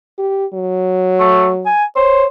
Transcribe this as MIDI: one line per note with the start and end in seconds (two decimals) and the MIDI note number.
0.19 0.46 67
0.54 1.71 54
1.20 1.48 57
1.66 1.84 80
1.96 2.25 72
1.96 2.25 73